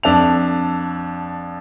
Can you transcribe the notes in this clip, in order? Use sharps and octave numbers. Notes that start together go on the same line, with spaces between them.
F2 D4 A4 F7